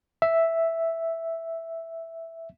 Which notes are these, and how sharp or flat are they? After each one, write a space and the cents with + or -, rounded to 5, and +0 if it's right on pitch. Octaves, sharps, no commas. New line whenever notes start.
E5 +0